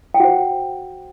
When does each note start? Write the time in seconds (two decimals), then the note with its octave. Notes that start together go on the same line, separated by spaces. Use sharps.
0.14 G5
0.20 F#4 C5 F#5